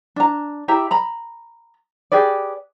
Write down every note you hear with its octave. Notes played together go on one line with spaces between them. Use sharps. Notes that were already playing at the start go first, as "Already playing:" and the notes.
D4 A#5
E4 G4 E5 A#5
A#5 B5
G4 G#4 B4 D5